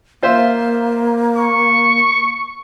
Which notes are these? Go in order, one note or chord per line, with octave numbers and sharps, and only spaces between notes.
A#3 F4 C5 E5
C#6